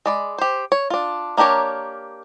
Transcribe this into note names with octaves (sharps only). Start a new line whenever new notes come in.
G#3 D5 B5
G4 C5
C#5
D4 F4
A#3 D4 G4 A#4 C#5